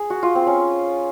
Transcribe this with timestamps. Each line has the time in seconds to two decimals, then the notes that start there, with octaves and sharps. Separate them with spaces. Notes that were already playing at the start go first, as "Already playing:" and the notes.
Already playing: G#4
0.10 F#4
0.23 F4
0.35 C4
0.47 C#4